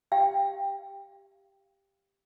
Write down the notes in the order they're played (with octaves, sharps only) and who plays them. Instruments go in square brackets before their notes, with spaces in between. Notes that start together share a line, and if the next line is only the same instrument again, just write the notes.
[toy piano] G4 F5 G5